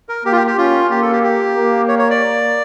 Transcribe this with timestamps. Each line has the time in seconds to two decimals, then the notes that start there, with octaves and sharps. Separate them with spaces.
0.09 A#4
0.25 A#3 G4
0.32 F4
0.36 G4
0.47 G4
0.58 C#4 F4
0.91 A#3 G4
1.02 A4
1.12 G4
1.23 G4
1.56 A#3
1.88 C#5
1.99 C#5
2.10 D5